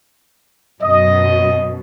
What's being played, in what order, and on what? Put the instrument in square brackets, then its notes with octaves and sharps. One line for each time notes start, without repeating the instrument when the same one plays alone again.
[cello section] F#2 B2 [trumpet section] D#5